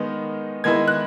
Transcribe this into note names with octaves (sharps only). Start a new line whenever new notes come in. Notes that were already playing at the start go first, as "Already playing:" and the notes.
Already playing: D#3 G#3 B3 D#4
D#3 G#3 B3 E4 G#6
F#6